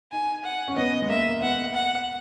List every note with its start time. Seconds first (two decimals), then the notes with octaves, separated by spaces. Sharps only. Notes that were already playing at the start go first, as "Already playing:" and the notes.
0.12 D#4 G#5
0.44 F#5
0.68 C#4
0.77 B3 D#5
1.02 G#3
1.09 A#3 E5
1.42 B3 F#5
1.74 F#5